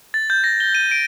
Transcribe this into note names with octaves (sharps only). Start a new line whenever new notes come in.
A6
G6
A#6
G7
D#7
D7